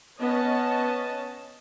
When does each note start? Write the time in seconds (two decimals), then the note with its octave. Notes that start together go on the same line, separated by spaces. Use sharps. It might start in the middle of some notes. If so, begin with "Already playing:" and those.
0.18 B3 C#4 D#5 A5